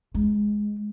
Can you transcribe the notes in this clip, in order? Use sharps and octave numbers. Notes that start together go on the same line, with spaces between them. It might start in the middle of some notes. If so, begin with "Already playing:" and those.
G#3